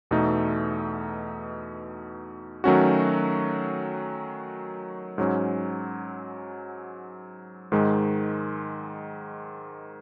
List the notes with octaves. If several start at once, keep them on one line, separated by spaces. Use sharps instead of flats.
E2 B2 A3 D#4
D#3 F#3 A3 C#4 F#4
G#2 F#3 C#4
G#2 D#3 G#3